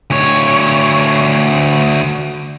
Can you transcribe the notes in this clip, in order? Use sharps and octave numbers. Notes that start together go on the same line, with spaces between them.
D2 C#5